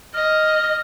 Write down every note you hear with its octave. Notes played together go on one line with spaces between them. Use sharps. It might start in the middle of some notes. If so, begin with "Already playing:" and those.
D#5 F6